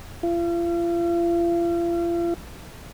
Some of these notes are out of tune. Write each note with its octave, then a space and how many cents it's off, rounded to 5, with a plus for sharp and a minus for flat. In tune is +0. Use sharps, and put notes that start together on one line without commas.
F4 -40